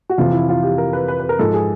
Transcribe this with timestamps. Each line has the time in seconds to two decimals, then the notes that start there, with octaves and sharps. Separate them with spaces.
0.10 F#4
0.18 F2 C3 E3 F4
0.33 E4
0.49 F4
0.63 G4
0.78 A#4
0.93 B4
1.08 B4
1.19 B4
1.29 A#4
1.39 G#2 F3 A4
1.54 G#4